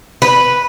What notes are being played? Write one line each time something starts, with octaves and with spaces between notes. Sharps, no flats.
B4